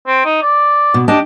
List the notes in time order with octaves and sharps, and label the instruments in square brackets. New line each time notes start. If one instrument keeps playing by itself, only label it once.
[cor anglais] C4
D#4
D5
[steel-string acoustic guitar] B2
[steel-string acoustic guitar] D4 D#5 A5 [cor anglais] G4